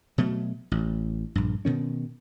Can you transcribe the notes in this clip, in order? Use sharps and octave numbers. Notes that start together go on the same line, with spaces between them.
B2 F#3 A3
A1
A#1 G2
B2 D#3 C#4